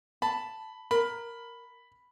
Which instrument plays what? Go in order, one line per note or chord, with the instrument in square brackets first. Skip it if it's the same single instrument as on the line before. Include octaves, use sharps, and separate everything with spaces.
[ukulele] A5 [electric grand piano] B5
[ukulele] A#4 [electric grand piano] B5